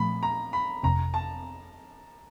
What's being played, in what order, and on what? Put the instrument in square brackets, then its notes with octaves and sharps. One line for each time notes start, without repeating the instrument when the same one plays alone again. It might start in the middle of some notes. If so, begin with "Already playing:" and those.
Already playing: [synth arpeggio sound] A#2 F3 A3 [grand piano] B5
[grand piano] A#5
B5
[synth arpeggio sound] G1 F2 C3 [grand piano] A#5
[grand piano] A5